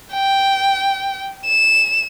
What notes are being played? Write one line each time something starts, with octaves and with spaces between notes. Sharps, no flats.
G5
E7